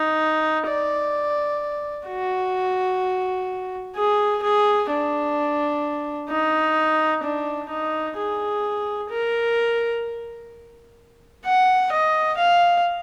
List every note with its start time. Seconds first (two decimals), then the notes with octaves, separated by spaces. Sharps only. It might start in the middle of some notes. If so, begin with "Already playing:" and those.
Already playing: D#4
0.68 D5
2.08 F#4
3.96 G#4
4.43 G#4
4.89 D4
6.29 D#4
7.24 D4
7.69 D#4
8.17 G#4
9.10 A#4
11.45 F#5
11.92 D#5
12.38 F5